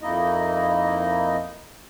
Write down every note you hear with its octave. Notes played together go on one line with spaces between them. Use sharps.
F2 A#3 D#4 E4 D#5